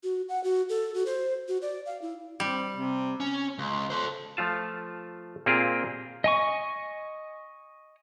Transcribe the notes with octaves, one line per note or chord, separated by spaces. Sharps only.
F#4
F#5
F#4
A4
F#4
C5
F#4
D5
F5
E4
G3 C4
C3
C#4
C#2
A4 C5
F3 A3 F4 A5
A#2 A#3 C4 F4 G4 G#4
D#5 G#5 C#6